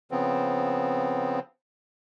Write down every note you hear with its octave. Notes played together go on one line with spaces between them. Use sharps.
C#3 F3 B3 C4